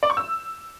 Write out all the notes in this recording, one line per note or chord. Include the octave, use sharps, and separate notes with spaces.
D5
C#6
E6